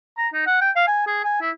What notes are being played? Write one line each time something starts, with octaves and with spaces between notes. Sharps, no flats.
A#5
D#4
F#5
G5
F5
G#5
G#4
G#5
E4